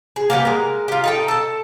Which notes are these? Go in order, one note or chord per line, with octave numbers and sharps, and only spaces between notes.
G#4
A#3 B3 G4 B4
G#3 A#4
F4 G4
D#4 A4 G5
A4 A5